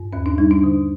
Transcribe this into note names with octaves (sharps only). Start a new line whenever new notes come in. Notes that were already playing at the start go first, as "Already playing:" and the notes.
Already playing: G2
D#2 C#4
D4
G3 D#4
D4
D3